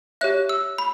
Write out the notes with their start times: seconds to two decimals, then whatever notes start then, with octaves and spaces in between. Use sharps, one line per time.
0.21 G4 C#5 E5 F#6
0.49 E6
0.78 B5